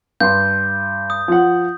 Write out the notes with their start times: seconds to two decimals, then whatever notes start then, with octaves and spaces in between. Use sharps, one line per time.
0.21 G2 C6 G6
1.10 D#6
1.28 F3 F#5